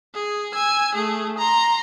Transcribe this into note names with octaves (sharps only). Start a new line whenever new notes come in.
G#4
G#5 E6
A3 G#4
A#5 C6